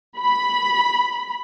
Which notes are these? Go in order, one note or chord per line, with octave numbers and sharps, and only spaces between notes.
B5